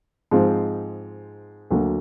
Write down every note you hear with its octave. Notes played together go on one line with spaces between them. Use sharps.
G#2 F3 G#3 C4 F4
D2 D3 F#3 A#3